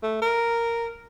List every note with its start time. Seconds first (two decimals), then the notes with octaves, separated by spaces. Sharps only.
0.03 A3
0.22 A#4